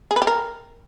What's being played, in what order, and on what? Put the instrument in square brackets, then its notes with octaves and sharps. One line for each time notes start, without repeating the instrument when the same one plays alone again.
[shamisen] G#4
B4
G4
A#4